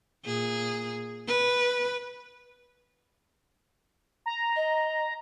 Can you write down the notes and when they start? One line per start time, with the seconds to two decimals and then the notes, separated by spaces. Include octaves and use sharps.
0.25 A#2 G#4
1.27 B4
4.26 A#5
4.56 D#5